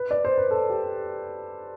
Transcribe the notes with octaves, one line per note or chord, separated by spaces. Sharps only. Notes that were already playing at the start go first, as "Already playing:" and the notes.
Already playing: B4
D5
C5
B4
A4
G4